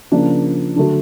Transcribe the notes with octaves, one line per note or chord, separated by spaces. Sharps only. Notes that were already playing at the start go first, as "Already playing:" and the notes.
C#3 F3 A#3 D4
D3 F#3 A3 D4